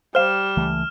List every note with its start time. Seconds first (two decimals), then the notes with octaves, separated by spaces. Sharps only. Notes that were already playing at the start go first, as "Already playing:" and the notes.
0.15 G3 C5 F5 F6 E7
0.57 C#2 E3 A3